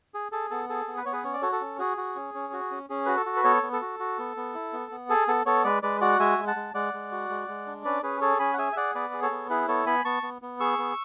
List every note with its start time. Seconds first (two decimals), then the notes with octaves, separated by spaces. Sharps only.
0.14 G#4
0.32 G#4 A4
0.50 B3 A4
0.69 G#4 A4
0.88 B3
0.97 B4
1.05 B3 C#5
1.13 G#4 B4
1.24 C#4 C#5
1.33 D5
1.42 F#4 A4 C#5
1.52 A4
1.61 C#4
1.79 F#4 G#4
1.97 F#4
2.16 C#4
2.34 C#4
2.53 F#4
2.71 C#4
2.90 C#4 G#4
3.06 F#4 B4
3.17 A4
3.26 F#4
3.36 B4
3.44 B3 A4 C#5
3.63 B3
3.72 A4
3.81 F#4
4.00 F#4
4.18 B3
4.37 B3
4.54 E4
4.73 B3
4.91 B3
5.09 G#4 A4
5.28 B3 A4
5.46 B3 A4 C#5
5.64 G#3 B4 D5
5.82 G#3 B4 D5
6.01 F#4 D5 F#5
6.20 G#3 E5 G#5
6.38 G#3
6.47 F#5 A5
6.56 G#3
6.74 G#3 D5 F#5
6.94 G#3
7.12 F#4
7.30 G#3
7.48 G#3
7.66 D4
7.85 C#4 B4 D5
8.03 C#4 G#4 B4
8.21 G#4 A4 C#5
8.39 C#4 G#5 B5
8.54 F#5
8.58 G#4 E5 G#5
8.72 E5
8.76 G#4 D5 F#5
8.95 B3 B4 D5
9.13 G#4
9.22 A4 C#5
9.31 B3
9.50 E4 G#4 B4
9.68 B3 A4 C#5
9.86 B3 G#5 B5
10.05 B3 A5 C#6
10.23 B3
10.42 B3
10.60 G#4 C#6 E6
10.78 B3